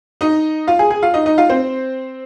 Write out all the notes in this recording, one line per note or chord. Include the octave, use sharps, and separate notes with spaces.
D#4 D#5
F4 F5
G#4 G#5
G#4 G#5
F4 F5
D#4 D#5
D#4 D#5
F4 F5
C4 C5